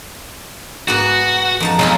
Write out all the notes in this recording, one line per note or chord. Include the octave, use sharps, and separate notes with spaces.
G#2 B3 F#4
F2 D#4 A5
B1 G#3 D#4 F4